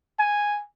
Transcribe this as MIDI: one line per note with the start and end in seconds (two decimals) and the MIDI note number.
0.19 0.62 80